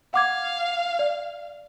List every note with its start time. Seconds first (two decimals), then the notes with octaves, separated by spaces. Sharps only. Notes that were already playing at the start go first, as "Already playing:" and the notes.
0.14 F5 F#5 D6 G#6
0.99 D5